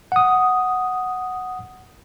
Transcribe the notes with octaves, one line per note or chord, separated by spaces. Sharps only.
F#5 D#6